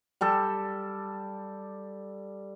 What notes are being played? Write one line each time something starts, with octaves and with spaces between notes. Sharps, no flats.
G3 G4 A4